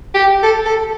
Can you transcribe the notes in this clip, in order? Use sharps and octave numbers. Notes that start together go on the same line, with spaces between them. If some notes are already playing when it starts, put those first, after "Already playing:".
G4
A4
A4